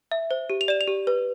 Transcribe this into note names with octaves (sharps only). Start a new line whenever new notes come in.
E5
C5
G4
F7
D5 E7
F7
G4
B4